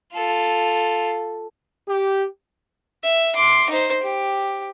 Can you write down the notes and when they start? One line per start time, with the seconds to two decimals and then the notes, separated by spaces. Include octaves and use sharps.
0.14 F4 A4
1.88 G4
3.03 E5
3.36 C6 D6
3.70 D#4 C5
4.03 G4